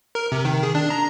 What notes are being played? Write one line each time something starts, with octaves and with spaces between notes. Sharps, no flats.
A#4
C3
D#3
G#4
D4
A#5